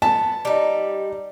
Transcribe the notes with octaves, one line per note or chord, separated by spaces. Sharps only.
B3 A5
G3 D#4